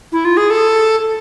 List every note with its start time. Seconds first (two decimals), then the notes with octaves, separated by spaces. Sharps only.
0.12 E4
0.25 F4
0.37 G#4
0.50 A4